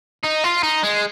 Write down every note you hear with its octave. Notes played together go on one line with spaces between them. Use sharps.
D#4
F4
D#4
G#3